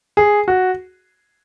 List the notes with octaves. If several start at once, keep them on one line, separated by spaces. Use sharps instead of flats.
G#4
F#4